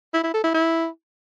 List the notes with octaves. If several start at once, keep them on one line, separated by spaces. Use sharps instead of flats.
E4
E4
A4
E4
E4